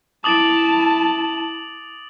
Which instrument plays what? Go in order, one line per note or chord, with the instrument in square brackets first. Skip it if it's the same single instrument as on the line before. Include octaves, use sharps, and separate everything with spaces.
[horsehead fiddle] E4 A5 [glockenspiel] D6 A6 D7 [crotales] D#6 F#7